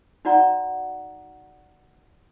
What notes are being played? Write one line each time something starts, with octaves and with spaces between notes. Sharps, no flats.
D#4 F#4 D5 F#5 A#5